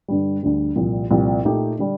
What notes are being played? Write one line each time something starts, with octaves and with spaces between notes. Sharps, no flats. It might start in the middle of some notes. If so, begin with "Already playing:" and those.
G2 D3 G3
D2 D3 G3
C2 A#2 F3
C2 A#2 F3 C4 G4
A#2 A3 D#4 G4
D3 G3 D4